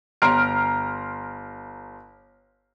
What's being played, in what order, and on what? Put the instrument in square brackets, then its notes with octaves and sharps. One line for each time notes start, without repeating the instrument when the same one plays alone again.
[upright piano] G1 A#5 C6 F6 D7